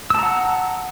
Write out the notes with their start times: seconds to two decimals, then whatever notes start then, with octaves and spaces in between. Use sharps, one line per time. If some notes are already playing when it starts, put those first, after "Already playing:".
0.10 E6
0.15 A5
0.19 A#5
0.23 F#5